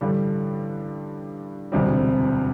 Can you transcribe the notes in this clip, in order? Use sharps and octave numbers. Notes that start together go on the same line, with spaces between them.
A1 G2 D3 G3
E1 D2 C3 G3 C4